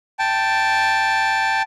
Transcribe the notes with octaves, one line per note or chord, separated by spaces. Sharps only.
G5 A5